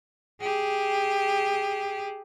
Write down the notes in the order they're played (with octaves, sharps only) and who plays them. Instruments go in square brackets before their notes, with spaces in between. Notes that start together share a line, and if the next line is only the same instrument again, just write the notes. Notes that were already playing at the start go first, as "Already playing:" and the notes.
[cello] G4 G#4